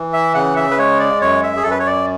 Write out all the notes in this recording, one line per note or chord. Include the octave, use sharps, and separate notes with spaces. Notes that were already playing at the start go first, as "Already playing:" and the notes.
Already playing: E3
E5
C#3 F#5
E5
B4
G#3 C#5
D5
F#2 C#5
E5
G#4
F#2 A4
B4
C#5
D5